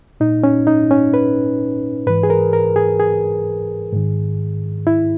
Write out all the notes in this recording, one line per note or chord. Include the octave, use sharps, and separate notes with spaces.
A#2 D#4
C#4
D#4
C#4
B4
G#2 E3 B4
G#4
A#4
A#4
G#4
G#4
G#2 D#3
E4